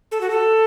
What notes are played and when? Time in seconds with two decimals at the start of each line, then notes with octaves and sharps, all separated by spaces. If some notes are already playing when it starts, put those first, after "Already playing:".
0.12 A4
0.21 F#4
0.30 A4